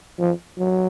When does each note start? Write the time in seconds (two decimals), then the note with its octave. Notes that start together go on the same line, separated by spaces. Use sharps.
0.19 F3
0.58 F#3